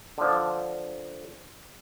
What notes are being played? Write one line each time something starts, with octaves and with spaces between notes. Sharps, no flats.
D3 F3